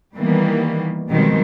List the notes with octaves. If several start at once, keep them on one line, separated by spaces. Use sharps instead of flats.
D#3 E3 G3 A#3 B3
B2 D#3 F3 G3 G#3 C4